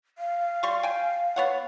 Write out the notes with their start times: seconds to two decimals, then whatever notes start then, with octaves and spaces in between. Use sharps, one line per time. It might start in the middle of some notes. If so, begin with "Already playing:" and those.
0.18 F5
0.63 G3 C6 C#6
0.83 G5 G#5
1.36 B3 C#5 F#5